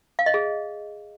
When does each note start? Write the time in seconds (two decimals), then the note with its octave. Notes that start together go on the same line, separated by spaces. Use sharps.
0.19 F5
0.26 D#5
0.34 G#4